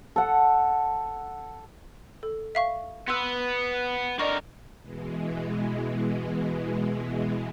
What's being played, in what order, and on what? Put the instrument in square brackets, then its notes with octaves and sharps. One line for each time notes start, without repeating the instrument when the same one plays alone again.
[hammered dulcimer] A4 F#5
[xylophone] A4
E5 F5 C#6
[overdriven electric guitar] B3 B4 [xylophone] C6 E6
[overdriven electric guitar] D3 A#4 [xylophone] D5 D#5 C#6
[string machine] B2 E3 G#3